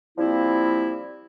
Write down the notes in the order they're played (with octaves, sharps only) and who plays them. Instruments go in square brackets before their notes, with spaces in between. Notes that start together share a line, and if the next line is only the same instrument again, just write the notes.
[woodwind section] F3 G3 A#3 C4 E4